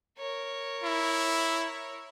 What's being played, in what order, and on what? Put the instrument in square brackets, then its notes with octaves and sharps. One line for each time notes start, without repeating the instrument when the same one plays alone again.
[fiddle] A#4 C#5
[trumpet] E4